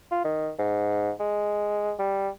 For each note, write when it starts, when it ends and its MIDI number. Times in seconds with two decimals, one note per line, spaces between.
0.11 0.21 65
0.24 0.50 51
0.59 1.11 44
1.20 1.93 56
1.99 2.29 55